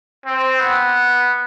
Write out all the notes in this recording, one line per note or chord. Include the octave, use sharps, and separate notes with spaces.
C4
B3